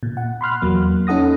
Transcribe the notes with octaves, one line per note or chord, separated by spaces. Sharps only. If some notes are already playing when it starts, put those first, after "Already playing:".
A#2
F#5
B5 C6 F6 F#6
E2 F#3 A#3
C#4 D#4 A4 F#5 D#6 A#6